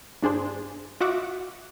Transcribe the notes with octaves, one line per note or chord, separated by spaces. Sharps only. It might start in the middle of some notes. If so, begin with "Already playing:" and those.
G2 D4 G#4 C5
F4 F#4 D#5 E5 F#5 D6